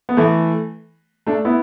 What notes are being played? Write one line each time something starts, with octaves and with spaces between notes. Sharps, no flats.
B3
E3 A3
A3 D4
B3 E4